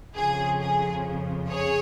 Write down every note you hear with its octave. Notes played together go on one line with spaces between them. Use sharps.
F2 C#3 F3 G#4
G#4
G#4 C#5